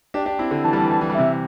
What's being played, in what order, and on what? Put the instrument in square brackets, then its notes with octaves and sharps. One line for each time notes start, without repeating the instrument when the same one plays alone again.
[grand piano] D4 G4
D4 G4
C4 E4
D3
[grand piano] E3 [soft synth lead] A5
[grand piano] G3
E3
G3
E3
G3
[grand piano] C3 E3 [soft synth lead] E5